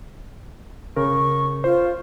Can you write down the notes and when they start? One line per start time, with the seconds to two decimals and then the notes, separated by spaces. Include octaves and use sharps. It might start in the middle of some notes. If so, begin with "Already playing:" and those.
0.96 C#3 A#4 C#6
1.64 F4 C5